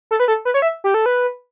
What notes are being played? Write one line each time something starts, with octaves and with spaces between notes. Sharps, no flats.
A4
B4
A4
B4
C#5
E5
G4
A4
B4